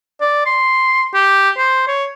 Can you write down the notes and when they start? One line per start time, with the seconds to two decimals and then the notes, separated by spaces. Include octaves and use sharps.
0.21 D5
0.46 C6
1.14 G4
1.57 C5
1.87 C#5